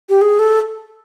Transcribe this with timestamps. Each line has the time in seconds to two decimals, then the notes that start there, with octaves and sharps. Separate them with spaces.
0.09 G4
0.21 G#4
0.39 A4